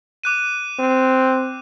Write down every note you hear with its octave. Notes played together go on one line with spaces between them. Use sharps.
D6 F#6 D#7
C4